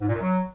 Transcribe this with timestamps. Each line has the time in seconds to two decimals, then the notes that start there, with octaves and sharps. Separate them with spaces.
0.01 G#2
0.08 A#2
0.15 F#2
0.22 F#3